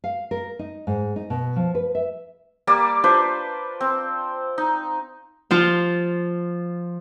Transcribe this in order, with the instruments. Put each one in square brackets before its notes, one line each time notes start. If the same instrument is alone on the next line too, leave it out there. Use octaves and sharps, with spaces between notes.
[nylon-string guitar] F5
A#4
D#4
G#2
D#4
B2
F3
B4
E5
[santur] G3 A#3 A#4 D5
D4 F4 B4 C5
C4
D#4
[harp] F3 F4